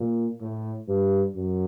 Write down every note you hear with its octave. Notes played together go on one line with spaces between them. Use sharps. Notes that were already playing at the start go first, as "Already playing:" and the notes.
Already playing: A#2
A2
G2
F#2